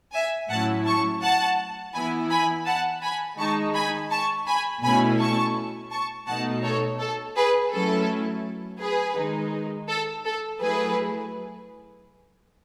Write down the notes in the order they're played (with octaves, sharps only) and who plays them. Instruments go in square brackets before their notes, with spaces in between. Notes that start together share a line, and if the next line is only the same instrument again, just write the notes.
[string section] E5 G#5
A2 F#3 C#4 E4 F#5 A5
A5 C#6
F#5 A5
E3 B3 E4 G#5 B5
G#5 B5
F#5 A5
G#5 B5
D#3 G#3 D#4 A5 C#6
G#5 B5
A5 C#6
G#5 B5
B2 A3 C#4 E4 G#5 B5
A5 C#6
A5 C#6
B2 A3 D#4 F#5 A5
A4 C#5
A4
G#4 B4
F#3 A3 C#4 E4 A4
G#4 B4
D#3 G#3 D#4
A4
A4
F#3 A3 E4 G#4 B4